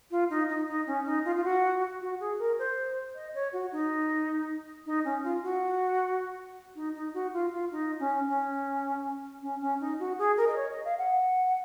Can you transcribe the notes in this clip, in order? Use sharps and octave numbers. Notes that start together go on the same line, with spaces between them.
F4
D#4
D#4
D#4
C#4
D#4
F4
F4
F#4
F#4
G#4
A#4
C5
D#5
C#5
F#4
D#4
D#4
C#4
F4
F#4
D#4
D#4
F#4
F4
F4
D#4
C#4
C#4
C#4
C#4
D#4
F#4
G#4
A#4
D#5
C#5
D#5
F5
F#5